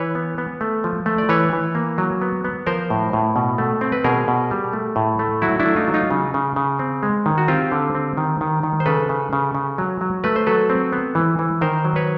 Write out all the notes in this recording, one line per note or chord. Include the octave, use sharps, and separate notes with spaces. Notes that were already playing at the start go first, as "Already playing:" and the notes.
Already playing: E3 B4 C#5
B3
B3
A3
F3
A3
D5
E3 B4 C#5
E3
A#3
F#3
B3
B3
F3 A#4 C5
A2
A2
B2
A3
C4
B4
B2 G#4 A#4
B2
G3
A3
A2
A3
F#3 E4 F#4
D4 E4
A3
D#4 F4
F#3
D#4 F4
C#3
C#3
C#3
C4
G#3
D#3
F#4
C4 F4 G4
D3
C4
D#3
D#3
D#3
C5
C#3 A4 B4
C#3
C#3
C#3
F#3
F#3
A3 B4
C5
F#3 A4 B4
C4
B3
E3
E3
D#3 A#4 C5
F#3
B4 C#5